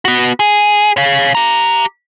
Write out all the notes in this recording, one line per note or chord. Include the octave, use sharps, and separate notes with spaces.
B3 F#4
G#4
C#5 F5
G4 A#5